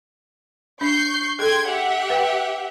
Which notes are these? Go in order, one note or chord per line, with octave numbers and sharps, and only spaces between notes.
D4 C#6 G6 C7
G#4 A4 G5 C6 G#6
G4 E5 F#5
B4 G5